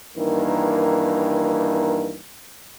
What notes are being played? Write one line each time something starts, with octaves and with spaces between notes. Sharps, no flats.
G2 D#3 E3 A#3